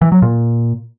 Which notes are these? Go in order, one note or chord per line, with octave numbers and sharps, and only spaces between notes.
E3
F#3
A#2